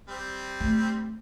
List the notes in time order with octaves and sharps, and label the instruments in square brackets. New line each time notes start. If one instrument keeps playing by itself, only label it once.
[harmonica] G3 C4
[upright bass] A3